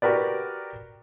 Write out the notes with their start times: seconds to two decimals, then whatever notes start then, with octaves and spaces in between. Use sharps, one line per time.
0.02 F#4 G4 A#4 B4 D5